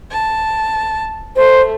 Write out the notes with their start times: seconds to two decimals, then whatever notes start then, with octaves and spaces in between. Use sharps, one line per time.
0.11 A5
1.36 A3 C5